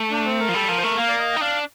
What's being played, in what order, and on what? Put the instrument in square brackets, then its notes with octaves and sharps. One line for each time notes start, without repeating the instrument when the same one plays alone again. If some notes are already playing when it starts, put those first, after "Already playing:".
Already playing: [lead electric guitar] A3
[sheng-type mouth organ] D4
C4
A#4
[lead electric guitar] F3
[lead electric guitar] G3 [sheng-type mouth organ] A4
[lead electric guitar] F3 [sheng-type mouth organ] A#4
[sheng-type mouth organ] C5
[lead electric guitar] A3 [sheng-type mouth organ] A#4
[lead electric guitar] A#3 [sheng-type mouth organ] F5
[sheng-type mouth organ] D5
D#5
G5
[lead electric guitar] D#4
[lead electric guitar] D4 [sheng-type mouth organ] F5